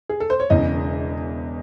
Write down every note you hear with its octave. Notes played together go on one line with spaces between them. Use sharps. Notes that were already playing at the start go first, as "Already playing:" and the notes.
G#4
A4
C5
C#5
E1 E2 C#3 E3 D#5